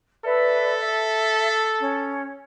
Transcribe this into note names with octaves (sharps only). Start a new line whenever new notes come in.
A4 B4 D5 E5
E5
C#4